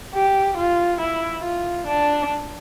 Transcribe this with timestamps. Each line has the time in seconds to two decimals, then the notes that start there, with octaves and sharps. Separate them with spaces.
0.14 G4
0.57 F4
1.01 E4
1.44 F4
1.87 D4